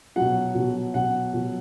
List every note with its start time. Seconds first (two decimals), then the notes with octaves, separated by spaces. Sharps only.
0.16 B2 F#3 F#5
0.55 B2 F#3
0.94 B2 F#3 F#5
1.33 B2 F#3